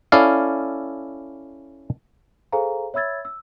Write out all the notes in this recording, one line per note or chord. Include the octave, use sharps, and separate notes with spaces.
C#4 E4 A4 D5 F5
G#4 A4 C5 F5 G#5 A#5
C#5 E5 B5 E6 G#6 A6
E6